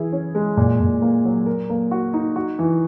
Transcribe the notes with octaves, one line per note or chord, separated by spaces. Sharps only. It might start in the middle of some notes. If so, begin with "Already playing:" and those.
Already playing: E3 E4 G#4
C#4
G#3
A#2
A#2
A#3
F#3
A#4
A#3
F#4
D#4
F#4
E3